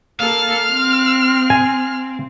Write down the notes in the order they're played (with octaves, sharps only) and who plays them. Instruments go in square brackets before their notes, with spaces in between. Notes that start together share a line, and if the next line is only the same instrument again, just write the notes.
[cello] A#3 A4 [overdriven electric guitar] F5 [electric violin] F6
[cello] C4
[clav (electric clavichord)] G#5